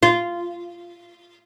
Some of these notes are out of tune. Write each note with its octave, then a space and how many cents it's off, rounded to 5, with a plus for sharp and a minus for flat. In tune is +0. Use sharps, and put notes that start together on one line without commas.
F4 -10